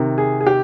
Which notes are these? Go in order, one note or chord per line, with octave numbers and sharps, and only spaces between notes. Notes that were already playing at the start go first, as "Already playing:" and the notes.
Already playing: C3 D#3
G#4
G#4
G4